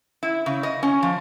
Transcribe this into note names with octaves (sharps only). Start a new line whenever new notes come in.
E4
C#3
D#5
C#4
F3